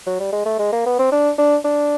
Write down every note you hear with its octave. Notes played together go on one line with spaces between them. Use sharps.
F#3
G3
G#3
A3
G#3
A#3
B3
C4
D4
D4
D4